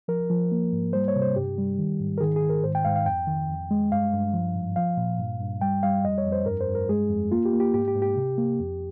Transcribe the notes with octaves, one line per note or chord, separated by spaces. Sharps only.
F3 A#4
F3
A#3
G#2
G3 C5
C#5
C3
C5
G2 G4
G3
D#3
G#2
A#4
D#3 G#4
G#4
D#3
A#4
G#2 C5
G5
G#2 F5
F5
F2 G5
D#3
F2
G#3
G2 F5
G2
F3
G#2
F3 F5
A#2
G2
G2
G3 G5
G3 F5
F2 D#5
C#5
F2
C5
G2 A#4
C5
G2
A#4
G#3 G#4
F2
A#3 F4
G4
A#3
G4
G#2 G4
G4
G#2
G4
C3
A#3
F2